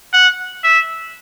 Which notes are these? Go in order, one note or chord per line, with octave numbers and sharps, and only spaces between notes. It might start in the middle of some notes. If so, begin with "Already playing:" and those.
F#5
E5